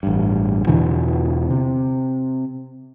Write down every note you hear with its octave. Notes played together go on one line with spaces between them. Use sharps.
A1 G2
E2 B2 D3 E3
C3